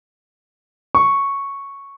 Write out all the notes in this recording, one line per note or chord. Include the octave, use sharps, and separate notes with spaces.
C#6